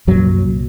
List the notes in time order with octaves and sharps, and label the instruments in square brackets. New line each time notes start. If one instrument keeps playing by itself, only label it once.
[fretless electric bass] C2 F#2 A#2 F#3